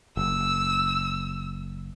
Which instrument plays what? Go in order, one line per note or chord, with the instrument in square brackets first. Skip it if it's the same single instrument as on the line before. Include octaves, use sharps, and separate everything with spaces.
[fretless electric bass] F#1 [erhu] E6